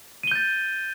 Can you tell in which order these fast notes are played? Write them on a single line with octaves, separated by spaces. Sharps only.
D#7 G7 G6 A6